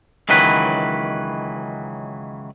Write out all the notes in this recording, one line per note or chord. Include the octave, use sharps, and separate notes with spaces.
C#2 D#3 E3 F#3 B4